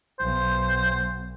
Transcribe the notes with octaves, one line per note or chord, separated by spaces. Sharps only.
B1 C5